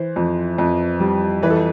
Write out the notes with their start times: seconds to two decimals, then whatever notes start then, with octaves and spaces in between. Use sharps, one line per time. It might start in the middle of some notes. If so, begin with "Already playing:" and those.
Already playing: E3 C5
0.16 F2
0.58 F2
1.00 G3
1.42 E3 B4
1.50 A4